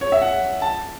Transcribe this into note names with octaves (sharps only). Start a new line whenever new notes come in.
C#5
E5
F#5
A5